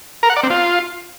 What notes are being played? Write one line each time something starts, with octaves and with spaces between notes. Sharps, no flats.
A#4
F#5
D5
C4
F4